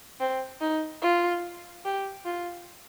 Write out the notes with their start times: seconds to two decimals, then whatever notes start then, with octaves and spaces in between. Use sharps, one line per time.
0.20 C4
0.61 D#4
1.02 F4
1.85 G4
2.25 F4